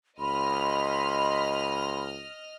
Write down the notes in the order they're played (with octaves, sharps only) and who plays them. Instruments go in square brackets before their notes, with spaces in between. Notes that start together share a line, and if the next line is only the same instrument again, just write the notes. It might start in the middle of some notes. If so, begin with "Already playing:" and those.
[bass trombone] C#2 [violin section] D#5 F6 [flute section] B5 C6